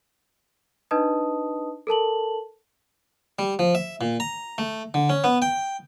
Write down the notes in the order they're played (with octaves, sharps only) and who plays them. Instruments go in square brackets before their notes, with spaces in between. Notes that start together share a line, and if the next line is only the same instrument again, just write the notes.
[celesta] D4 D#4 B4 D#5 A5 D#6
A4 A#4 A5 F#7
[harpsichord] G3
F3
E5
A#2
A#5
A3
D3
C#4
B3
G5